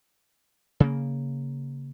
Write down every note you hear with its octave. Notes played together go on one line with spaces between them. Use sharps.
C#3 A#3